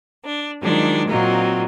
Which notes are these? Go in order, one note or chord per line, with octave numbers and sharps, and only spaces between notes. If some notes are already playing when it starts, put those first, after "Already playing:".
D4
D#3 F3 F#3 G#3 D4
A#2 F#3 C4 D#4 F4